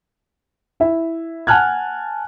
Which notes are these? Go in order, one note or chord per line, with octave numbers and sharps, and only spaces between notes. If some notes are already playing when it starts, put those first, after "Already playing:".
E4 E5
F#5 G#5 A5 F6 F#6 G#6